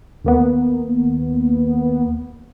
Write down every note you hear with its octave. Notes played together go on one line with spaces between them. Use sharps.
D#2 A#3 B3